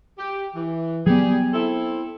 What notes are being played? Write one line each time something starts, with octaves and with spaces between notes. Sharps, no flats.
G4
E3
F#3 G3 B3 G4 G#4
C4 E4 A4